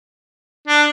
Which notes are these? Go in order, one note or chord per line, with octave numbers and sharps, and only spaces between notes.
D4